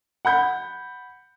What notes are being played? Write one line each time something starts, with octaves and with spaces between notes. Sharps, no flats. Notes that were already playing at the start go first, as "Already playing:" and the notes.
F#5 B5 G6